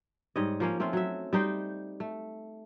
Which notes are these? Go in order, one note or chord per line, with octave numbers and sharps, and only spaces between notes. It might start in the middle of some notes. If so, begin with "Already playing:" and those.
G#2 G3 C#5 D#5
F3 A#3 C#4
A3 C4 C#4 F4
F#3 E5
G3 D#4 C5 G5
A3